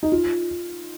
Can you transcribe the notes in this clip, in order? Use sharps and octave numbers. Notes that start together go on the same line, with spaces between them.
D#4
F4